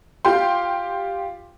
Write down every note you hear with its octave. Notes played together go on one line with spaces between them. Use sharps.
F4 G4 G5 C6